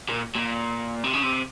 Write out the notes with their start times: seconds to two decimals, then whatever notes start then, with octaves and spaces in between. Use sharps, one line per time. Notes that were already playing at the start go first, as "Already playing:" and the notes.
0.09 A#2
0.35 A#2
1.04 C3
1.14 C#3
1.23 C3